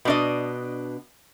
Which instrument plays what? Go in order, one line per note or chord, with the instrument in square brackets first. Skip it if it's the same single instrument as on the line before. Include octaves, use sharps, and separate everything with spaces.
[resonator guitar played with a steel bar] B2 D4 D#5